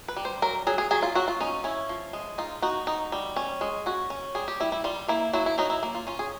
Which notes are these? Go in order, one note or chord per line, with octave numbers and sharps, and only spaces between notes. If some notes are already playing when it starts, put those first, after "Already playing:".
B4
G3
C5
F#3 A#4
F#3 G#4
G#4
F#3 G#4
F4
F#3 F#4
F4
C#4 D#4
C#4 E4
F3
G#3
D#4 F4
D#4 F#4
D#4
G3
C#4
G#3
C#4 F#4
C#4
G3 G#4
G4
G3 E4
E4
G3 F4
A#3 E4
F#3 E4
E4
F#3 D#4
E4
A#3
F4
C#4 F4
G#4